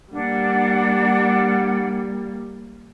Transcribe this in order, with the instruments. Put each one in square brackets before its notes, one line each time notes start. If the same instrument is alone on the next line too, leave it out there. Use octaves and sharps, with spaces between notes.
[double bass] G3 A#3 [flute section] D4 F#5